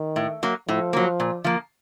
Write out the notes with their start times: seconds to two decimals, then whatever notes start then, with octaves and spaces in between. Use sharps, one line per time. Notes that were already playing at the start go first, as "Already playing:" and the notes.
Already playing: D#3
0.16 A2
0.43 F#3 A#3
0.68 A2 F3
0.93 F#3 A#3
1.20 A#2
1.44 F3 A#3